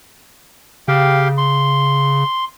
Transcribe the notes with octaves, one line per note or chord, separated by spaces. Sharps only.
C#3 G4 F5 G5
C6